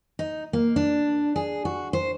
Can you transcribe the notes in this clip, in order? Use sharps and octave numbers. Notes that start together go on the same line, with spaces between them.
D#4
A#3
D4
G#4
F#4
C5